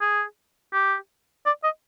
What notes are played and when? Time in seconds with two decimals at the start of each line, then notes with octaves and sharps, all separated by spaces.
0.01 G#4
0.73 G4
1.46 D5
1.64 D#5